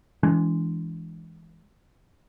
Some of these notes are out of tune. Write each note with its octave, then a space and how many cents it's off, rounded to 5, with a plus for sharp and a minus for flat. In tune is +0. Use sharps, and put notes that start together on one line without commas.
E3 +0 G#3 +0 D4 -45